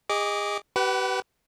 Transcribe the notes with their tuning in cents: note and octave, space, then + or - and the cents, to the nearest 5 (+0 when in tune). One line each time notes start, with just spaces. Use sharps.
G#4 -30 D#5 +0 D6 -20
G4 -35 B4 +0 F#5 +35